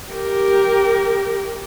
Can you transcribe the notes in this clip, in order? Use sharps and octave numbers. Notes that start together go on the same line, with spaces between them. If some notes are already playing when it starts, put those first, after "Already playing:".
G4 A#4